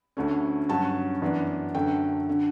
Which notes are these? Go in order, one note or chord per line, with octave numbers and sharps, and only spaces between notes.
D2 D3 A3 C#4
G2 F#3 C#4 A5
F#2 E3 B3 D4
F#2 D3 A3 G5
D3